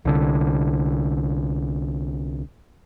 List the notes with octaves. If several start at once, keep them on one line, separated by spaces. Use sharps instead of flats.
C2 D3